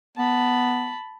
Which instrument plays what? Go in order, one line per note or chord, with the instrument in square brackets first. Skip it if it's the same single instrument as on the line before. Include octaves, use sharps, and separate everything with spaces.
[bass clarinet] B3 [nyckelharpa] A5 B5